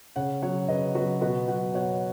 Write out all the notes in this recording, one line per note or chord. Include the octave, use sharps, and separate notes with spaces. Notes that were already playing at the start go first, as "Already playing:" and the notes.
C#3 C#5 F#5
F#3 C#5 F#5
C#3 B4 D#5
F#3 F#4 B4
B2 F#4 B4
F#3 F#5
B2 C#5 F#5